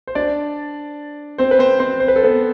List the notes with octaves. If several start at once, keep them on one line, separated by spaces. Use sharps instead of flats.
C5
D4 D5
C4 C5
B4
C4 C5
C4 C5
C5
B4
A4
B3 B4